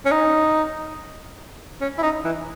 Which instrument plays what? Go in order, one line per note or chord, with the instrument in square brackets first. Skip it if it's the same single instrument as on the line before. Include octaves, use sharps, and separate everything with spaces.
[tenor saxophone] C#4
D#4
C#4
E4
D#4
E3